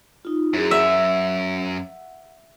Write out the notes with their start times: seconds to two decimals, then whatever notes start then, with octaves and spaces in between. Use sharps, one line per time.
0.25 D#4 F4
0.54 F#2 E4 F#4 G#4
0.71 E5 F#5